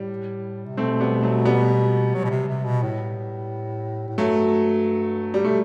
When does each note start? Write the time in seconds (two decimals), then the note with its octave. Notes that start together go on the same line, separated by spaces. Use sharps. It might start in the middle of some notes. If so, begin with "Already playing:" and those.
Already playing: A2 G3
0.66 C3
0.77 B2 A3 C4
1.00 G3 B3
1.23 F#3 A3
1.45 G3 B3
2.14 F#3
2.24 B2
2.30 C3
2.48 C3
2.64 B2
2.83 A2
4.09 A2
4.18 G2 F#3 A3
5.34 G3
5.44 B2 A3